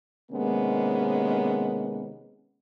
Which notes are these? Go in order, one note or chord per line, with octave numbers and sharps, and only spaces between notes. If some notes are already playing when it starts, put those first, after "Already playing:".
C3 D#3 G#3 A#3 B3 C#4